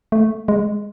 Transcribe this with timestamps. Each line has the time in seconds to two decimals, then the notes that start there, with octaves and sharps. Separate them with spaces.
0.12 A3
0.48 G#3